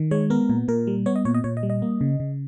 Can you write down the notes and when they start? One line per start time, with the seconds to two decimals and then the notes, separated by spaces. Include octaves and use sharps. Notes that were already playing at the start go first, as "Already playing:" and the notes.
Already playing: D#3
0.11 G#3 C#5
0.30 B3 A#4
0.49 A#2
0.68 A#2 A#4
0.87 G3
1.06 B3 C#5
1.16 D#5
1.25 A#2 C#5
1.34 D#5
1.44 A#2 C#5
1.57 D#5
1.63 G3
1.70 D#5
1.82 A#3
2.01 C#3
2.20 C#3